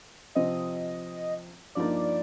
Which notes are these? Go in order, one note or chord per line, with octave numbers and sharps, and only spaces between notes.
C3 F3 C4 D#5
G2 F3 A#3 D#4 D5